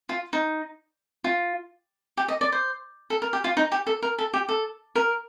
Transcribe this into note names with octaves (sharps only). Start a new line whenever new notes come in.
F4
D#4
F4
G4
D#5
D5
C5
A4
A#4
G4
F4
D#4
G4
A4
A#4
A4
G4
A4
A#4